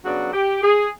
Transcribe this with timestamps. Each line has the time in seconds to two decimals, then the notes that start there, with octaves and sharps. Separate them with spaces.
0.03 C#3 F#3 B3 D4 F#4
0.32 G4
0.62 G#4